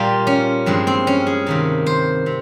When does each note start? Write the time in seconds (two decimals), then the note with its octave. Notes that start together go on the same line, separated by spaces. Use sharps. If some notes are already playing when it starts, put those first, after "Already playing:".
Already playing: A#2 G3 A#3 F4
0.27 C#4
0.66 G2 F3 G#3 C4
0.87 C4
1.07 C#4
1.27 G#4
1.46 C3 D#3 A#3
1.86 C5
2.26 C3